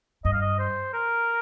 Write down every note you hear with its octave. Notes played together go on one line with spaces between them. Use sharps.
G2 D#5
F5
D#5
C5
A#4